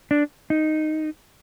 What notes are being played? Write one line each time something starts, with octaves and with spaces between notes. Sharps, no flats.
D4
D#4